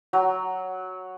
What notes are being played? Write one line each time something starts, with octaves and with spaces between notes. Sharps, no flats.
F#3